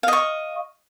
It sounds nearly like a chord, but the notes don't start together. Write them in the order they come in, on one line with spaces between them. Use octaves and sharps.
F5 D#5 C#6